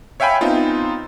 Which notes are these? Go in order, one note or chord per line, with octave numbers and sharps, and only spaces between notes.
C#5 E5 F5 G5 G#5 B5
B3 C4 D#4 F4